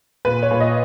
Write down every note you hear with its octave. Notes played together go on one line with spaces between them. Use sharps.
A#2 B4
C#5
A#2
D#5